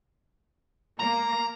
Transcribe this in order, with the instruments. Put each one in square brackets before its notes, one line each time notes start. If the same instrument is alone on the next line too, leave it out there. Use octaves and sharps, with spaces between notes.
[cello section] A#3 [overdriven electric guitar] A#5